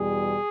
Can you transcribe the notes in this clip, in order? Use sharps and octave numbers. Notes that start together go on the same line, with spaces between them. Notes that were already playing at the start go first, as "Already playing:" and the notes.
Already playing: E2 B2 G3 G#4